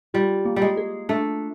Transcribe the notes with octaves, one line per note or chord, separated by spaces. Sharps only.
G3 F4
A#3
G3
G#3
G#4
A3 D4